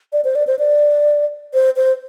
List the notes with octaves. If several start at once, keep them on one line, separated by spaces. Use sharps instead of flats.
D5
C5
D5
C5
D5
C5
C5